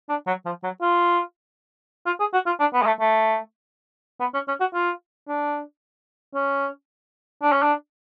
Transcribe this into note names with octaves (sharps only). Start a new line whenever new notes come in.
D4
F#3
F3
F#3
F4
F4
G#4
F#4
F4
D4
B3
G#3
A3
A3
B3
C#4
C#4
F#4
F4
D4
C#4
D4
C#4
D4